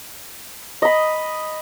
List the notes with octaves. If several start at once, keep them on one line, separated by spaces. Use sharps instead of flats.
D#5 B5